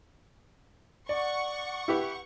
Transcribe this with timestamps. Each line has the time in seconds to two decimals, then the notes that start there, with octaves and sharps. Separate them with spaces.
1.09 D5 F#5 C#6
1.88 E4 G4 B4